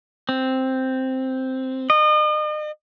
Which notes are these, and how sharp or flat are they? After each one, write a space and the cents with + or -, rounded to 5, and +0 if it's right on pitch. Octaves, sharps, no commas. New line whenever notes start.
C4 +0
D#5 -40